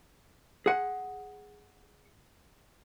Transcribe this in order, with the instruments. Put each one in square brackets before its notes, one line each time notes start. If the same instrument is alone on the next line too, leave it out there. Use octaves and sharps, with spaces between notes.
[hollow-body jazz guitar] G#4 F#5